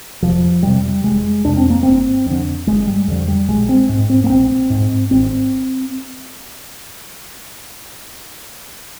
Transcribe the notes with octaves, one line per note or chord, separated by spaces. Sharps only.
F1 F3
F2 C3 G3
F1 G#3
F2 C3 D4
C4
A#3
G1 C4
F2 D3
G1 G#3
G3
F2 D3
G3
A#1 G#3
C4
G#2
C4
A#3
A#1 C4
G#2
G#1 C4